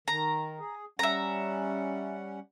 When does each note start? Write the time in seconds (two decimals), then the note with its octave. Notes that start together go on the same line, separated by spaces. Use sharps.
0.08 D#3 A#5
0.60 G#4
0.99 G3 C#4 E5 F#5 A#5